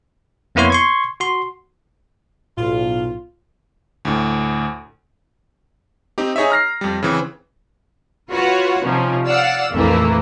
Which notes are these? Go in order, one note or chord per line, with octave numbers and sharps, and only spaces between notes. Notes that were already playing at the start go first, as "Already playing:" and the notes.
F2 A#3 B3 E4 C#5 C6
C6 C#6 G#6
F#4 C6
B1 A2 F4
D2 A2
C4 D#4 G4
D#4 G#4 C#5 D#5 E5
A#5 F6 A#6 C7
F2 G3
C#3 E3 C4
F4 F#4 B4 C#5 F#5 B5
C3 F3 C#4 D#4
D5 F5 F#5 E6
A#1 F2 E3 A3 A#3